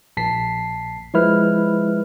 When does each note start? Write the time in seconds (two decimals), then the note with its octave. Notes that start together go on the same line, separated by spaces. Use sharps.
0.17 A#1 A5 B6 C7
1.14 F3 G#3 E4 B4 F6